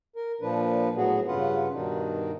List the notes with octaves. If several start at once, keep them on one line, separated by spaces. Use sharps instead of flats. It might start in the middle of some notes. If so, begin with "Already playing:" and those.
A#4
A#2 F3 D4 B4
A2 F#3 B3 F#4 G#4
G2 C#3 C#4 F4 B4 F#5
G2 B2 D#3 D4 D#4